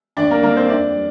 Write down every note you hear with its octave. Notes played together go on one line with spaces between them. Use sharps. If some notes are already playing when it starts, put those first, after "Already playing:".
D#2 D4 D5
A#3 A#4
D#3 G3 A#3 A#4
C4 C5
F2 D4 D5
G3